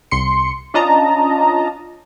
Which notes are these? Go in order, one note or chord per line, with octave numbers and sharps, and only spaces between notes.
C2 C6 C#7
C#4 D4 F4 D#5 A5 A#5